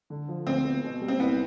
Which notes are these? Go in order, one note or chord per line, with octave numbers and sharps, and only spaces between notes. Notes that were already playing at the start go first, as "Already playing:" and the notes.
D3
F3
D2 C4
B3
B2
G3
C4
C2 B3